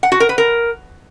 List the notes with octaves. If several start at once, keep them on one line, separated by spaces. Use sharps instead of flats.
F#5
F#4
A#4
B4
A#4